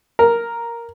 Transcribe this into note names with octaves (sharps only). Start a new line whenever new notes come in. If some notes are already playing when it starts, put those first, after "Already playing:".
A#4